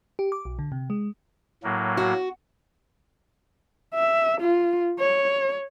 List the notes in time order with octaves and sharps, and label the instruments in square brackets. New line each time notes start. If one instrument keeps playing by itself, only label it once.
[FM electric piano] G4
D6
B1
D3
C3
G#3
[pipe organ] A2 F#3 A#3
[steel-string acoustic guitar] F#4
[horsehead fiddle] E5
F4
C#5